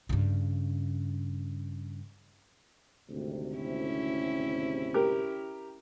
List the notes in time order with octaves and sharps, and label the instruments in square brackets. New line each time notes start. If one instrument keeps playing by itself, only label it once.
[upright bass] G2 C#3
[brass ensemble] G#1 D2 C3
[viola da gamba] C#4 E4
[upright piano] G4 A#4